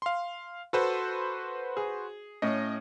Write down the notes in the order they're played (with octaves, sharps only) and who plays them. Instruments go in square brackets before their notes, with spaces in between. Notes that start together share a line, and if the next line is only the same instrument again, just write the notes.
[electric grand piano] F5 C6
[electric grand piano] F#4 B4 C5 [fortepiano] A4 C6
[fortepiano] G#4
[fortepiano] A2 C#4 [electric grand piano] D#5